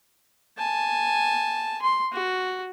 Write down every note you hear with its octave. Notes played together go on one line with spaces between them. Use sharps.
G#5 A5
C6
F#4